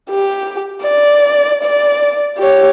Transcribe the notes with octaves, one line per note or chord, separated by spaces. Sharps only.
G4
D5
D5
G4 C#5